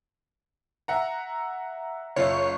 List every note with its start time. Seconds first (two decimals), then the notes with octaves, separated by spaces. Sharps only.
0.88 E5 F#5 A#5
2.16 F#1 F4 C#5 E5